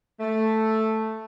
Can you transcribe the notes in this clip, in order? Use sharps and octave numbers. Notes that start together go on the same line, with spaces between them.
A3